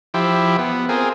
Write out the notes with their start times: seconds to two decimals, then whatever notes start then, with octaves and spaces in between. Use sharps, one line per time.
0.14 F3 E4 G4
0.58 B3
0.89 C4 F4 G#4 A#4